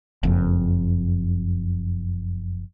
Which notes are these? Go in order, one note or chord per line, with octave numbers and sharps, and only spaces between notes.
F#1 F2